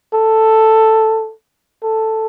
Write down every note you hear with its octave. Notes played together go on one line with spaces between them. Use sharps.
A4
A4